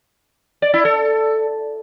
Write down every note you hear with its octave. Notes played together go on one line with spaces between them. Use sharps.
D5
E4
A4